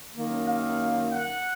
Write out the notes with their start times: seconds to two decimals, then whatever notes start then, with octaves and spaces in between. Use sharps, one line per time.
0.16 F#2 D#3 A#3
0.48 F5
1.12 F#5